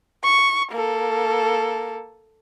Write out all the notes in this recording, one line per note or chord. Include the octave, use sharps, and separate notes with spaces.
C#6
A#3 A4